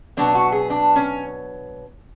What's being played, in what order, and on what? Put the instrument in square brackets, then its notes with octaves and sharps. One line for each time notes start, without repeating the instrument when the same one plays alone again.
[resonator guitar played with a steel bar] B2 F#3 B3 D4
F#4
G#4
D4
C#4